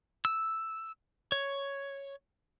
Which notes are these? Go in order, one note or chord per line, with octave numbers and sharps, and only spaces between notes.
E6
C#5